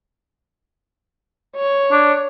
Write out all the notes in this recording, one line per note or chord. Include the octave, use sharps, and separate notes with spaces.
C#5
D4